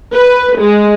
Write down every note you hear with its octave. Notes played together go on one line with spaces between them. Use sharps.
B4
G#3